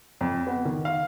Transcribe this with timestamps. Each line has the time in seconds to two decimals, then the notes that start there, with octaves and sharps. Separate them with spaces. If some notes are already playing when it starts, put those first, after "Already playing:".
0.21 F2
0.47 B3
0.65 D#3
0.85 F5